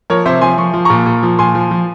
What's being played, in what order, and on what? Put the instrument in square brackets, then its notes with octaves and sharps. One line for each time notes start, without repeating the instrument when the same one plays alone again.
[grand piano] F3 A#4 C#5
C3 C5 E5
F3 G#5 C6
F3 C#6
F3
A#2 A#5 C#6
A#2
F3
A#2 G#5 C6
F3
F3